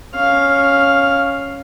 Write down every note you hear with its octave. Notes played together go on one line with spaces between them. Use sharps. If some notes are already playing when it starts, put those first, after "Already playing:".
C#4 F5